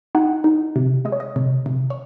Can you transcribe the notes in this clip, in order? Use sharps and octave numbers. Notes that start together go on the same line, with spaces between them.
D#4 F#5
D#4
C3
G#3 D#5
C#5
D#5
C3
C3
C#5